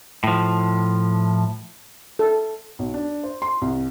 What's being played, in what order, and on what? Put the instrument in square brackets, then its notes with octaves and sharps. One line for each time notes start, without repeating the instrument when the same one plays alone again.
[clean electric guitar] A2 F3
[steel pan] A4
[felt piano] B1
D4
C5
C6
C2